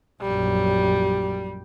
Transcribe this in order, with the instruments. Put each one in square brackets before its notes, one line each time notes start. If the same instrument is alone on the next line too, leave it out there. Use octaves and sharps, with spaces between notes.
[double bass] A#1 F#2 [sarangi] G3